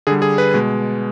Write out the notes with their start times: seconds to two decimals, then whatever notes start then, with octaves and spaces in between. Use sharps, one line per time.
0.07 D3 G3 G#4
0.22 G#4
0.38 B4
0.54 B2 G#3